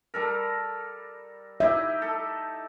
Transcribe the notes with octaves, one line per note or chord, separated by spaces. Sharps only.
G3 A4 A#4
D#4 E4 G4 E5
A4